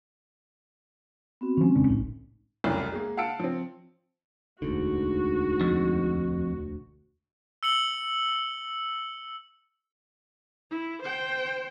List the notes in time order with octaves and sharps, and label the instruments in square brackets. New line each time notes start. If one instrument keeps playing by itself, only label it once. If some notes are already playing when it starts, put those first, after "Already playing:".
[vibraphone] B3 C4 F#4
[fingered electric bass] D#3 F3 [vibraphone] G#3 C4 C#4
[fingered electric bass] E1 C#3 D4
[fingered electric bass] G1 C2 A2 [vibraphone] D#4
[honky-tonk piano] F1 C2 F#2 E4
G#3 A#3
F5 F#5 A5 E6 C#7 D7
F3 C4
[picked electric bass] E1 D2 D3 [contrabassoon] G#2 [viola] F#4
[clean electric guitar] F2
[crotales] E6 C#7 F#7
[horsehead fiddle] E4
C5 G5